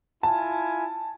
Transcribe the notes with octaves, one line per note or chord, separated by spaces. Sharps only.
E4 F4 G#5 A5